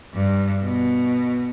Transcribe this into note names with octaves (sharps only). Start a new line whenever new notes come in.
G2
B2